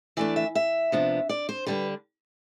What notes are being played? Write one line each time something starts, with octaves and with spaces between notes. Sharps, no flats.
E3 A3 D4 D5
E5
E5
C3 F3 B3 D4
D5
C5
D3 G3 D4 B4